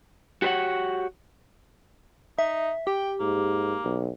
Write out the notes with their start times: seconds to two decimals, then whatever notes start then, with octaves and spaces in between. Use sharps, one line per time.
0.42 F#4 G4 C5 C#5 F#5
2.39 D#4 E5
2.87 G4 G5
3.20 G#2 A#3
3.85 B1